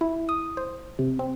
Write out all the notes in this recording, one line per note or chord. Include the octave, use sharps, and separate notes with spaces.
E4
D#6
C5
C3
C4